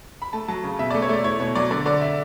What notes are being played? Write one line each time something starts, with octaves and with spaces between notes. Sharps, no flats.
B5
A3 A5
F#3 A5
C#3
B2 E5
A3 D5
C#5
A3 D5
E4 C#5
B2 C#5
F#3 D5
D3 D5
D3 D5
E5